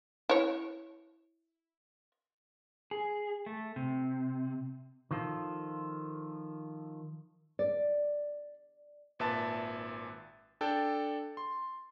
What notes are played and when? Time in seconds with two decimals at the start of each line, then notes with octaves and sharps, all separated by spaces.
0.29 E4 C#5
2.91 G#4
3.46 A3
3.76 C3
5.11 D#3 F3 F4 A4
7.59 D5
9.19 G#1 A#2 B4 E5 A5 A6
10.61 D4 A4 G5 A6
11.37 C6